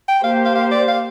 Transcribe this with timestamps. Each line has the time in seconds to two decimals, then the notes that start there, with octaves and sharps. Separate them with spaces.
0.08 G5
0.23 A#3 G4 C5 F5
0.45 F5
0.55 F5
0.71 D5
0.88 F5